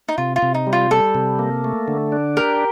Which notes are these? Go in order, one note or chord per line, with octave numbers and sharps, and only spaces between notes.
D#4
C3 F4
F4
C3
D#4
G3
F4
G3 A4
C3
A#3
A3
D3
D4
G4 A#4